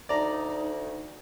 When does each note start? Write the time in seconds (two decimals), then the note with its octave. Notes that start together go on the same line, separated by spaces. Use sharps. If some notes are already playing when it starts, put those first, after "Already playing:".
0.09 D2 D#4 D5 A#5